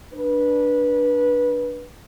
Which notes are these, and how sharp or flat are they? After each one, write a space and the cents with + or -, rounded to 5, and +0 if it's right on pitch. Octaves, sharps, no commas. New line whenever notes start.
D4 +0 B4 -20